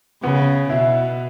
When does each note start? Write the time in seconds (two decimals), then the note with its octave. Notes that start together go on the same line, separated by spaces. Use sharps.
0.23 C#3 B3
0.69 B2 E4